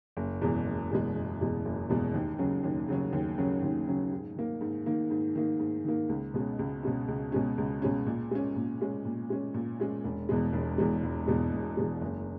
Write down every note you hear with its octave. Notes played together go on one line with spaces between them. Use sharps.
F#1
E2 B2 G#3
F#1
E2 B2 G#3
F#1
E2 B2 G#3
F#1
E2 B2 G#3
D#2
C#3 F#3 C#4
D#2
C#3 F#3 C#4
D#2
C#3 F#3 C#4
D#2
C#3 F#3 C#4
G#2
D#3 A#3
G#2
D#3 A#3
G#2
D#3 A#3
G#2
D#3 A#3
C#2
B2 G#3 C#4
C#2
B2 G#3 C#4
C#2
B2 G#3 C#4
C#2
B2 G#3 C#4
A#2
G#3 C#4
A#2
G#3 C#4
A#2
G#3 C#4
A#2
G#3 C#4
E1
E2 B2 G#3
E1
E2 B2 G#3
E1
E2 B2 G#3
E1
E2 B2 G#3
F#1